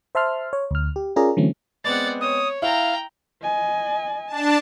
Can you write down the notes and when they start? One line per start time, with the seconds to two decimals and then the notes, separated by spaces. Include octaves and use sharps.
0.15 C5 E5 A5 C6 F6
0.53 C#5
0.71 D2 F6
0.96 G4
1.16 C#4 F4 G#4 A#4 D5 A#5
1.37 D3 E3 F#3 A3 C4 C#4
1.84 G#3 B3 C4 D5 F#5 A6
2.21 C#5 D#6
2.62 E4 F5 G5 A#5
3.42 D#5 G#5
4.27 D4 A5